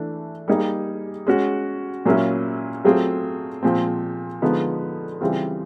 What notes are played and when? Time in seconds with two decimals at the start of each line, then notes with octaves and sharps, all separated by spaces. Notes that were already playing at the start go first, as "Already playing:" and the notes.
Already playing: E3 A3 D4
0.48 G3 A#3 D#4 G#4
1.27 G#3 C#4 F#4
2.05 A#2 F#3 A#3 C#4 E4
2.84 F#3 A3 C4 F4 G#4
3.63 A#2 F3 G#3 C4
4.42 D3 F3 G#3 B3 D#4
5.21 C#3 E3 G3 C4 F4